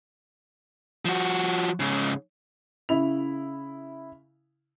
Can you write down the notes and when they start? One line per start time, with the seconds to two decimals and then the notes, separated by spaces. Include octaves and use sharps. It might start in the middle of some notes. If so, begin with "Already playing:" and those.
1.05 F3 F#4
1.80 G#2 C#3
2.89 C#3 E4 F7